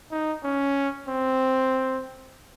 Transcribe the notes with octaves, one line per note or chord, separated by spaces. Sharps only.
D#4
C#4
C4